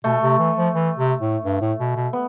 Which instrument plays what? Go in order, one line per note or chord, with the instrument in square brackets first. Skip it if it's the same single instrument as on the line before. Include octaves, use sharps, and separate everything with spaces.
[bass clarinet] B2 [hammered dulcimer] A3
[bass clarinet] C3
E3
F3
E3
C3
A2
G2
A2
B2
B2
[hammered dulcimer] B3